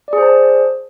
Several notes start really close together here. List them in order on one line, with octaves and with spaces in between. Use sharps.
D5 G#4 C5 A5